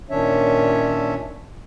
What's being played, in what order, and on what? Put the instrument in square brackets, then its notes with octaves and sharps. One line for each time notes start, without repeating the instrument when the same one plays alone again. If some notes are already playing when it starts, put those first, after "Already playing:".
[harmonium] A#2 D#3 C#4 D4 C#5 E5